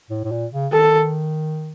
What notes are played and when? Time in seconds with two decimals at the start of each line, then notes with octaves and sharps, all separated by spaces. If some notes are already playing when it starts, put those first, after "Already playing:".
0.10 A2
0.24 A2
0.32 A#2
0.53 C#3
0.73 D#3 A4